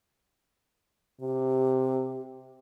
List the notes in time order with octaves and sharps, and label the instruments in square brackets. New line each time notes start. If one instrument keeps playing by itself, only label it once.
[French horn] C3 [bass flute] G4